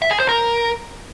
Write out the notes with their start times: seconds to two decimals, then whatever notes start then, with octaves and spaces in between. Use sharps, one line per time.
0.02 E5
0.11 G#4
0.20 C5
0.29 A#4